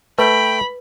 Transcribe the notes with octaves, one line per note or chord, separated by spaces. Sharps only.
A3 B4 G5 B5